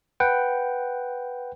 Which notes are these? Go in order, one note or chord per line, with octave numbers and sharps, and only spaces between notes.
B4 F#5 G5